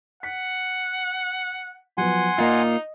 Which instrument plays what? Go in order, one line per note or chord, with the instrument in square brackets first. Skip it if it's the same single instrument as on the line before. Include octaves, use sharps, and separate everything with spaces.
[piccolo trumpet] F#5 [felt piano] B6
[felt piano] F3 F#3 B3 [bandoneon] F#5 G#5 C6
[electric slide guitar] A#3 F4 [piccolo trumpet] D#4 [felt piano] D#5